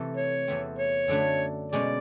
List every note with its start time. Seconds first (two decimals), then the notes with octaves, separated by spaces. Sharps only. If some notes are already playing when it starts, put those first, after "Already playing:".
Already playing: C3 E3 A3
0.17 C#5
0.48 E2 C3 E3 A3 C4
0.79 C#5
1.08 F#2 D3 F#3 A3 D4
1.72 B2 G#3 C#4 D5